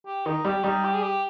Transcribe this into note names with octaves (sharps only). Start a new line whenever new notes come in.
G4
D#3 D#4
G3 G4
G3 D#4
G4
G#4
G4